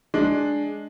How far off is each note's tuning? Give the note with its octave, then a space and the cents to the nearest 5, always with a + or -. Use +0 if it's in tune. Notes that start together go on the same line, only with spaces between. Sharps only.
G#3 +5 D4 +0